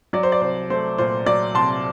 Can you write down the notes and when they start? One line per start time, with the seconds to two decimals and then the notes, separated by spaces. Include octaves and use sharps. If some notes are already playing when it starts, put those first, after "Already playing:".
0.13 F#3 D5
0.23 C5
0.32 D5
0.41 C2 C5
0.70 A3 C5
0.98 A#2 C5
1.26 F#3 D5
1.54 C2 A5 C6